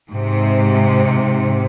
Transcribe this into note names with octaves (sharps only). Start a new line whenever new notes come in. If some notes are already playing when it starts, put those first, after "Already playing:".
G#2 C3